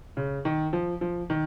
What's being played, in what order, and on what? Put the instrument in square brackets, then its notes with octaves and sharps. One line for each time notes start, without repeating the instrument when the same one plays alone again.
[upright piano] C#3
D#3
F3
F3
D#3